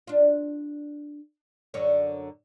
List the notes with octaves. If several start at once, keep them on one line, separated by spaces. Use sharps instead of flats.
D4 F4
F#2 D3 C#5